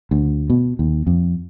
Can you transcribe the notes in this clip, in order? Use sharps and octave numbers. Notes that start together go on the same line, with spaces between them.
D2
B2
D#2
F2